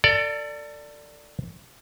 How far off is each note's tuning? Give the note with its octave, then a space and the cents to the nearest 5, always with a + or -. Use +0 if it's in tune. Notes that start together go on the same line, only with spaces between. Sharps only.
A4 +35 D5 +0